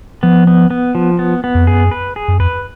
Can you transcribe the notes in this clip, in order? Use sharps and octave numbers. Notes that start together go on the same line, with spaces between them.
F3 B3
B3
B3
F3
B3
B3
F2
F#2 G#4
B4
G#4
F#2
F2 B4